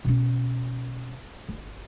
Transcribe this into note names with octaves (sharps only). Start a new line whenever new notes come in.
B2 C#4
G1